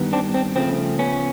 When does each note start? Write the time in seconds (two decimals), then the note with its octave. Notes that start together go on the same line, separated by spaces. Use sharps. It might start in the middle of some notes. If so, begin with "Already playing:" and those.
Already playing: G2 D#3 G3 B3
0.13 C4 D4
0.34 C4
0.56 C#3 F3 A3 C4
0.99 B3 C#4